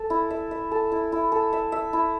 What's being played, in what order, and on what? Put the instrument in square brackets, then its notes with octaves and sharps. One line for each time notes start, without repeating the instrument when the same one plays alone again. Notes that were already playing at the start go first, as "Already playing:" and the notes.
Already playing: [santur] A4
E4
E5
E5
A4
E4
E4
A4
E5
E5
E4